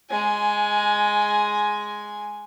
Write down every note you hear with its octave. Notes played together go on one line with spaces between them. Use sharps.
G#3 G#5